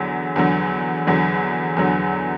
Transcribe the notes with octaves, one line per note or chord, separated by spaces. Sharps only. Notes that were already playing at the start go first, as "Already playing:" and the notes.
Already playing: E2 D3 F#3
E2 D3 F#3
E2 D3 F#3
E2 D3 F#3